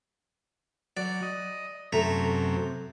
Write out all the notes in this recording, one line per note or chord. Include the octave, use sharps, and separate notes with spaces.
F#3 D5
D#5
F#2 C3 A3 A#5